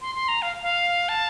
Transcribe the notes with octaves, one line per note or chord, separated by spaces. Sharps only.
C6
C6
A#5
F5
F5
A5